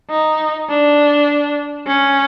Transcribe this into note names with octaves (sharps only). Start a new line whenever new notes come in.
D#4
D4
C#4